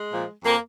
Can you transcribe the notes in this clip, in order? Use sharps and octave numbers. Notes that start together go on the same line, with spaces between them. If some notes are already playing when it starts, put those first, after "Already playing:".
Already playing: G#3
A#2 F3
F2 F3 A#3